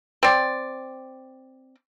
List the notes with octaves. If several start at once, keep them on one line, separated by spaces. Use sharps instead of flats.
C4 D5